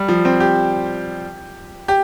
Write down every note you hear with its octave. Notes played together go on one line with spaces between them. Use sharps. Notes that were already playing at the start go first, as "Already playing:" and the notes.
Already playing: G3
F3
C4
G4
G4